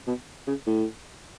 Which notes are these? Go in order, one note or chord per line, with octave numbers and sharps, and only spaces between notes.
B2
C#3
A2